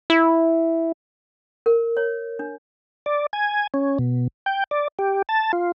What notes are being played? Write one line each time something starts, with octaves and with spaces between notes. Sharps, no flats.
E4
A#4
C#5
D4
D5
G#5
C#4
B2
G5
D5
G4
A5
F4